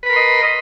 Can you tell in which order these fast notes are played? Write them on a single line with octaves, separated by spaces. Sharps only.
B4 B5 A#4 C6 D#5